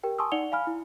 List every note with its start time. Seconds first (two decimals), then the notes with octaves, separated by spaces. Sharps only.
0.03 G4 A#4 G5
0.18 G#5 A5 C6 C#6 D#6 E6
0.32 D#4 D5 F#5 C#7 F7 G7
0.52 F5 G#5 B5 F6
0.67 E4